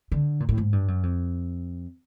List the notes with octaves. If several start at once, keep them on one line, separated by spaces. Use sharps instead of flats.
D3
A#2
A2
G#2
G2
F#2
F2